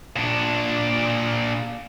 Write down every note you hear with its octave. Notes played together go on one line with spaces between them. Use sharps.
A#2 D4